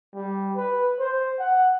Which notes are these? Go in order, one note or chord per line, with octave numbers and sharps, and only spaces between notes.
G3
B4
C5
F#5